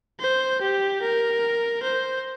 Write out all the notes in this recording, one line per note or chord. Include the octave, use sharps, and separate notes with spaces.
C5
G4
A#4
C5